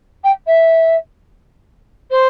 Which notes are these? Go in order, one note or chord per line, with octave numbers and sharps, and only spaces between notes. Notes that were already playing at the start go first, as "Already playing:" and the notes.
G5
E5
C5